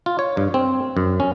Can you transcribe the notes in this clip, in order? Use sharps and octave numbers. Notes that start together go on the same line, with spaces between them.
F4
C#5
G2
C4
F#2
C#4